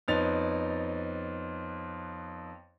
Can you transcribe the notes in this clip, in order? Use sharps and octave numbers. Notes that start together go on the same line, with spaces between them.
F2 B3 D#4 C#5 A6 F7